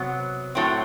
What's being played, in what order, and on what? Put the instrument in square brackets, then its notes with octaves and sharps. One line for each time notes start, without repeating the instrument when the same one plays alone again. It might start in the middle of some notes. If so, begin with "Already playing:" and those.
Already playing: [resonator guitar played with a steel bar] C3 F#3 B3
A2 F#3 C4